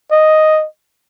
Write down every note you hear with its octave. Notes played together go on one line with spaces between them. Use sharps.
D#5